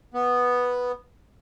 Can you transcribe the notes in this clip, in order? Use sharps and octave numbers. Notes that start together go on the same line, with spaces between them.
B3